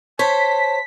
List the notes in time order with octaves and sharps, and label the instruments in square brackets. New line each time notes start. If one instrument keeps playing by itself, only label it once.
[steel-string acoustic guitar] C5 [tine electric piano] C#5 [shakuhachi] A5 [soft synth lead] B6